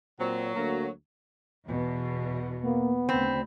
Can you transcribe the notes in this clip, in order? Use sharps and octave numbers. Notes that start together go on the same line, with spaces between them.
A#2 F#3 C4
D2 A#3 A#5
E2 B2
A#3 B3
D2 C#3 C4 B5